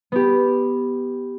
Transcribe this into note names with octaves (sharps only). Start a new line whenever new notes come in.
B3 G4